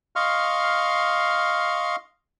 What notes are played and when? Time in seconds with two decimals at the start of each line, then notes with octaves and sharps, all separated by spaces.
0.16 D#5 F5 C6 C#6 F6